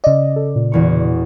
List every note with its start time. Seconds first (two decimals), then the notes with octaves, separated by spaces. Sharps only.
0.04 C#3 D5 D#5
0.36 A4
0.55 A#2
0.72 E1 E2 C#6